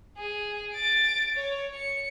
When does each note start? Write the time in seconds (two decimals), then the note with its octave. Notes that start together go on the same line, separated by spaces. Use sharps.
0.18 G#4
0.74 A6 D7
1.35 C#5
1.75 C#7